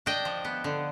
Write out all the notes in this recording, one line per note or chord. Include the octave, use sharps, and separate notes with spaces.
D4 D#5 G5
F3
B3
D3